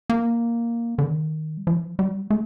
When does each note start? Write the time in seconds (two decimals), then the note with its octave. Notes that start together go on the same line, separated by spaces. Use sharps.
0.10 A#3
0.98 D3
1.04 D#3
1.57 G3
1.67 F3
1.99 G3
2.30 A3